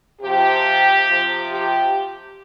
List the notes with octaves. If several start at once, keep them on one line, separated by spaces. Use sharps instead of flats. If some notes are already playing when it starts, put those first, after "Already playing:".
C3 F3 G4
C3 F3
G4